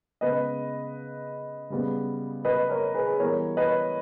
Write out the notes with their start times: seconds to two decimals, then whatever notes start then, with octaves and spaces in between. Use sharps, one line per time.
0.21 C#3 G#3 B3 B4 D#5
1.70 C#3 G3 B3
2.45 B4 D#5
2.69 A#4 C#5
2.94 G#4 B4
3.19 E3 G3 B3 A#4 C#5
3.57 B4 D#5